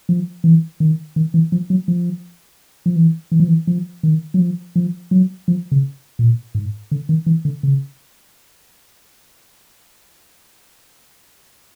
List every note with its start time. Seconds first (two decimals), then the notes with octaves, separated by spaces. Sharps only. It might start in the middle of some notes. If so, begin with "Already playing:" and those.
0.09 F3
0.44 E3
0.80 D#3
1.16 D#3
1.34 E3
1.52 F3
1.70 F#3
1.88 F3
2.86 F3
2.96 E3
3.32 E3
3.40 F3
3.48 E3
3.67 F3
4.03 D#3
4.34 F#3
4.40 F3
4.76 F3
5.11 F#3
5.48 F3
5.72 C#3
6.19 A#2
6.55 G#2
6.91 D3
7.09 D#3
7.26 E3
7.45 D3
7.63 C#3